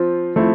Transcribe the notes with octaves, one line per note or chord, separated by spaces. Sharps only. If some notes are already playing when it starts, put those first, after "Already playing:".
Already playing: F3 C4 F4
F3 A3 C4 E4